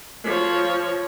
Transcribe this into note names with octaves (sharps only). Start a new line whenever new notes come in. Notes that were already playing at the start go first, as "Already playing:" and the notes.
F3 C#5